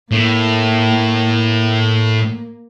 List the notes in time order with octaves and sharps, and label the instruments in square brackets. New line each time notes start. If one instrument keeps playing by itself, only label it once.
[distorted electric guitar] A2 [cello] A#3